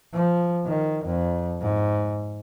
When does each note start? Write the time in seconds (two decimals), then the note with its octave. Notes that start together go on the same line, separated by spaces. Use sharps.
0.15 F3
0.66 D#3
1.05 F2
1.61 G#2